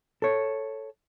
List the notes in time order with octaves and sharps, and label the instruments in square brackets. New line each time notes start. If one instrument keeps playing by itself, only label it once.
[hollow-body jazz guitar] A4 C#5